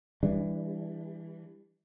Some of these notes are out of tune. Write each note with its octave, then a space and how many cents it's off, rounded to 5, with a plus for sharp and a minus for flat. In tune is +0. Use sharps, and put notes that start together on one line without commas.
E3 +0 G3 +35 D4 +0